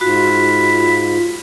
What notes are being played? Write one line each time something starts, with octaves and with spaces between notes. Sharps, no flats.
G#2 F4 F#4 B5